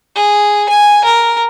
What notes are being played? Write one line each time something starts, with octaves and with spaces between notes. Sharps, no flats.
G#4
G#5
A#4